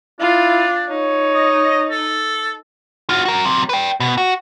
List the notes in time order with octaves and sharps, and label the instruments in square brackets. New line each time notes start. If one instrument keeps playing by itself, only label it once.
[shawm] D4 [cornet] E4 [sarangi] F4
[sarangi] D#4 [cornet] C#5
[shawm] D#5
A4
[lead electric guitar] F4 F#4
F#4 A#4
F#3 C4
B4 G5
B2
F#4